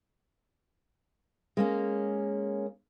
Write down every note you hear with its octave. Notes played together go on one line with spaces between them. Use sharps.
G#3 A#3 C#4